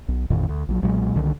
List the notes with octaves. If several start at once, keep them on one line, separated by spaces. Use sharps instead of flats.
B1
A1 F2 A#2 D#3
D2
A#1 F#3
B1 A#2 F#3 G#3
C2 D3 D#3